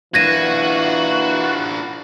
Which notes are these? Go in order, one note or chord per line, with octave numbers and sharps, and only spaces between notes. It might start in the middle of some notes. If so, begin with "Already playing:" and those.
E3 D4 F4 F#4 G#6 A#6 D#7